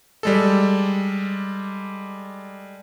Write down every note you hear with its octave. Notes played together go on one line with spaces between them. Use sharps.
G3 G#3 A4